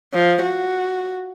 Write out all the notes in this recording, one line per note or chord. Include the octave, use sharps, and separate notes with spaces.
F3
F#4